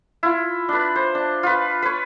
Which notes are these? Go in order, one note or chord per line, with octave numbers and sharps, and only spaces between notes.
E4 F4
D4 B4
C5
D4
F4 B4
B4 C#5